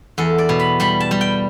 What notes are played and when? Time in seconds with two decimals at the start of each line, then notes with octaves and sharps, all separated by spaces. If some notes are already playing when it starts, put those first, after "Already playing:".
0.18 E2 A4
0.38 D5
0.49 B2
0.60 B5
0.80 G3 B5
1.00 A5
1.11 G3
1.21 G5